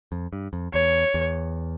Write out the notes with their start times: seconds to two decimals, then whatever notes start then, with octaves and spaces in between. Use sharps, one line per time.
0.12 F2
0.33 G2
0.53 F2
0.73 E2 C#5
1.14 E2